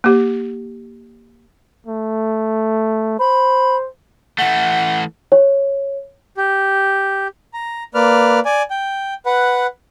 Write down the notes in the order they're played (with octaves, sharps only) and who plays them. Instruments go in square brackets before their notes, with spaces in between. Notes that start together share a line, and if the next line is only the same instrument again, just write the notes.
[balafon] A#3 G4
[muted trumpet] A3
[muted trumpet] C5 [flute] B5
[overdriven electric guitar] E3 A3 [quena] F#5
[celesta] C#5
[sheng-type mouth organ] G4
A#5
A#3 B4 D5 F6
D5 G#5
G5
B4 F#5